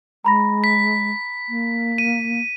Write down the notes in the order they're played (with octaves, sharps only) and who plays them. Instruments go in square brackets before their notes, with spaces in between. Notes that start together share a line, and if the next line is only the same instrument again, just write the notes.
[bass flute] G#3 [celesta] A#5 B5 A#6
[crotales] B6
[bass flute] A#3
[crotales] D#7